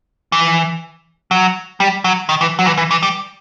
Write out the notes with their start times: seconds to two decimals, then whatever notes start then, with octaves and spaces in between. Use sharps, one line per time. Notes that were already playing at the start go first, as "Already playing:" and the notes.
0.32 E3
1.31 F#3
1.80 G3
2.04 F#3
2.29 D#3
2.41 E3
2.59 F#3
2.66 E3
2.78 E3
2.91 E3
3.03 G3